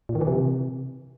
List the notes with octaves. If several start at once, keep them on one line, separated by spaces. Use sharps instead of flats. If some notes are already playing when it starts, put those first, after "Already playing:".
A#2
D#3
E3
C3